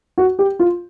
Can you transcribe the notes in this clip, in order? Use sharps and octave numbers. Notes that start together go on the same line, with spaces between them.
F#4
G4
F4